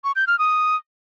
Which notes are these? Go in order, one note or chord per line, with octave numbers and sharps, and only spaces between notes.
C#6
G6
F6
D#6